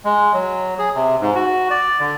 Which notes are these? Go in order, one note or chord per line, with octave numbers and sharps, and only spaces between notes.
G#3
F#3
G#4
C3
G#2
F#4
D5
D3